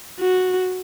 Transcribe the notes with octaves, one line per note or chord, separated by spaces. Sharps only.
F#4